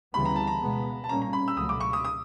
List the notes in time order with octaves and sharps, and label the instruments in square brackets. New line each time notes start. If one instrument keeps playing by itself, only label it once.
[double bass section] D2 C#3 E3 G3 B3 [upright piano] B5
[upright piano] A#5
A5
A#5
[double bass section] B2 G#3 B3
[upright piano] A5
[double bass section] A#2 G3 A#3 C#4 [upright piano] A#5
[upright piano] A#5
B5
E6
[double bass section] C#2 B2 F#3 A3 [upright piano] D#6
[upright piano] D6
C#6
D#6
D#6